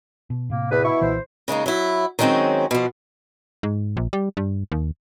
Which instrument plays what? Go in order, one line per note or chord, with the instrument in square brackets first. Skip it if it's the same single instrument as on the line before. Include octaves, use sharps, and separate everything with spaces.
[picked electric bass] B2
[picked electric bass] A2 C3 [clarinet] A#3
[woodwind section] E2 [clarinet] B4
[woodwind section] B2 E4 [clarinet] C#6
[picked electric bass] B1 A#2 E3 [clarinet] C5
[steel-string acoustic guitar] C#3 G#3 A#3 D#4
F#3 E4
D#3 F#3 G#3 A3 C4 C#4
B2 F3
[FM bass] G#2
A#1
G3
G2
D#2